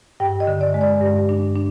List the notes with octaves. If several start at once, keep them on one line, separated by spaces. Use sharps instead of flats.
G2 G5
D#5
D3
D5
G#3
D5
G2
D4
D4